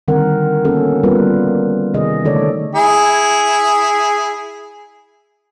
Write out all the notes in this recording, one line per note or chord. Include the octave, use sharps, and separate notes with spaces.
D3 D#3 G3 C4 A#4 F#5
A#3 B3 C#4 F#4 A4
G3 A#3 B3 F4 A#4 B4
C3 D#3 G#4 D#5
D3 D#3 A3 A4 C#5 D5
E4 G#4